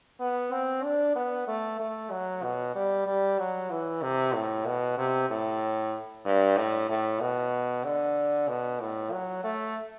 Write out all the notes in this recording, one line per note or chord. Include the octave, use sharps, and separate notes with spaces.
B3
C4
D4
B3
A3
A3
F#3
B2
G3
G3
F#3
E3
C3
A2
B2
C3
A2
G2
A2
A2
B2
D3
B2
A2
F#3
A3